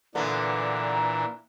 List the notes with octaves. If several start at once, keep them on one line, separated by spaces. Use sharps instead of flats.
A#2 D3 E3 B3 D4 A#5